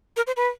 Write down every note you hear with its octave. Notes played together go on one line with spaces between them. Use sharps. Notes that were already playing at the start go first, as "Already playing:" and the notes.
A#4
C5
B4